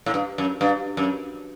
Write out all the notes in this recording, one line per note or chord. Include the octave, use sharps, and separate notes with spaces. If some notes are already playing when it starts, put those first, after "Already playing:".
A2
G2
F#2
G2
F#2